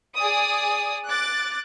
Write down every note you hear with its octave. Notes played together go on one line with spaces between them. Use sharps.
G#4 D5 D#6
D6 F#6 A6